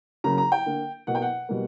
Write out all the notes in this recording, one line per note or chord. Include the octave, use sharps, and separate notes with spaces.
C#3 F#3 A#3 A#5
A#5
G5
D3 A#3
B2 A#3 F#5
G5
F#5
B2 G3 A#3